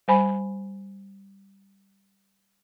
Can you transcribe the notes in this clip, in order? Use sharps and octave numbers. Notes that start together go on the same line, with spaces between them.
G3 C5 G#5 B5